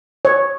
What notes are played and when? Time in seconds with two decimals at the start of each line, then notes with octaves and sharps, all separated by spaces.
0.25 C#5